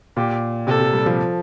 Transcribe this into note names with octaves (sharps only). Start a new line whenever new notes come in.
A#2 G4
C3 A4
C3
G3
F3